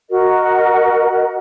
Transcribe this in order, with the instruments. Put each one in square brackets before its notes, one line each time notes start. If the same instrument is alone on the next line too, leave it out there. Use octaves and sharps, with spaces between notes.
[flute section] F#4 A#4 D#5